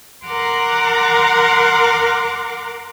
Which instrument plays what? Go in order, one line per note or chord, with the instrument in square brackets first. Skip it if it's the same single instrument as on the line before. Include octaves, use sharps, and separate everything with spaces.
[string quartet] A#4 F#5 A#5 C6 D6